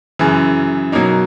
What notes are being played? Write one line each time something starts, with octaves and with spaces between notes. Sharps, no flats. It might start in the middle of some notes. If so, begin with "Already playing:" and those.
F#2 C#3 E3
B2 F#3 A#3 D#4